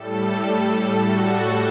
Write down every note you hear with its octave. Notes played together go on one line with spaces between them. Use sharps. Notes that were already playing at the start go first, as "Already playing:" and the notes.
Already playing: A2 G3 A4
F#4